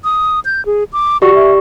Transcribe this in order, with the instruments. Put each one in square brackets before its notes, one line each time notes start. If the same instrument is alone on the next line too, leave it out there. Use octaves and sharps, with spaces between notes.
[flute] D#6
G6
G#4
D6
[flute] F#4 [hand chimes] G4 D5 C#6
[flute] E5